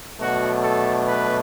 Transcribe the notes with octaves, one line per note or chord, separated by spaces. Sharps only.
B2 F#3 A3 D4 F#4
A4
B4